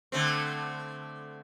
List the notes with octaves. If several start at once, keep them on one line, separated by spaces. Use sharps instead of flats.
D3 A3 C4